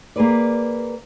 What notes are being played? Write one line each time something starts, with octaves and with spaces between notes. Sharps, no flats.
A#3 G#4 B4 D5